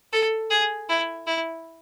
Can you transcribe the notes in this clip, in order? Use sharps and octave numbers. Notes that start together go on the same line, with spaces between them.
A4
G#4
E4
E4